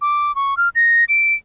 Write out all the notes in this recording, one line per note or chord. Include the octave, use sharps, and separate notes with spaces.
D6
C#6
F6
A#6
D7